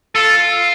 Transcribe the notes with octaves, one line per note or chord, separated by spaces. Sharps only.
F4 A4